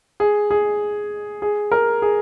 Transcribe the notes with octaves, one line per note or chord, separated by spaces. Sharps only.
G#4
G#4
G#4
A#4
G#4